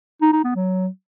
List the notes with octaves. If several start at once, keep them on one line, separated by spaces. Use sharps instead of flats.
D#4
D#4
B3
F#3